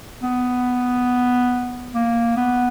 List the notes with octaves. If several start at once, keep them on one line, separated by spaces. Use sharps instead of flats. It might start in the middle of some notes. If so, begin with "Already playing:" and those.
B3
A#3
B3